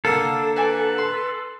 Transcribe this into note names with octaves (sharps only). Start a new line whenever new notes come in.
D3 A#3 D4 A4 F5
F#4 B4 G#5 D6
C6